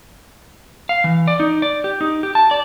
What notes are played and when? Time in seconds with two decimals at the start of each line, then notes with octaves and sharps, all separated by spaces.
0.89 F5
1.04 E3
1.28 D5
1.40 D#4
1.62 D5
1.84 G4
2.01 D#4
2.23 G4
2.35 A5
2.51 D5